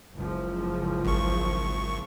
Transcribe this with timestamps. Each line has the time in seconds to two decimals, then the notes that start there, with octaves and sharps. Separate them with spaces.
0.15 F#1 C#2 F3
1.05 G#1 C#6